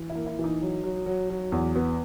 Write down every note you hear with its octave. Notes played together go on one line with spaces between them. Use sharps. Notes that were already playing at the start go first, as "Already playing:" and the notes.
Already playing: E3
E4
A#3
E4
E3
D#4
F#3
F#3
F#3
F#3
E2
B3